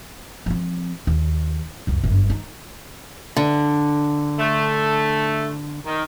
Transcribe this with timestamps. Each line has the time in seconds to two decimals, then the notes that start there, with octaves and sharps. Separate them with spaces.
0.46 F3 C4
1.07 D#2
1.87 C#2 F#2
2.03 G1 F#2
2.30 D#4
3.37 D3
4.38 A3
5.86 D#3